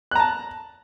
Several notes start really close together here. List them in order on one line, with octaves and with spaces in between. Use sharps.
F#6 A#5 A5